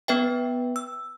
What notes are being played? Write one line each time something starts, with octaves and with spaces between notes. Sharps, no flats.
B3 B4 E5 G5
E6